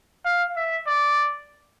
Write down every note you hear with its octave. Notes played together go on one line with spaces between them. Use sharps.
F5
E5
D5